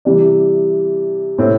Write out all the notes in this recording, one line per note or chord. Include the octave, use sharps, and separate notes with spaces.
C3 E3 G3 D5
A2 A3 C4